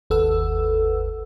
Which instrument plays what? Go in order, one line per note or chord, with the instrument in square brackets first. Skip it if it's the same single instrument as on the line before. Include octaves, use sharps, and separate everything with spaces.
[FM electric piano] G1 D#2 A4 B4 F#5 E6